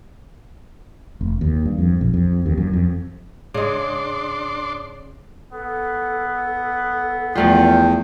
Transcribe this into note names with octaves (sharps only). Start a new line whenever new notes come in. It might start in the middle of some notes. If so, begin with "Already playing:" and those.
F1
D#2
G2
F2
A#1
F2
D#2
F#2
F2
G#2 C#3 G#3 D4 D5 C6 D#6
B3 A4
E2 F3 A3 F4 D5 G5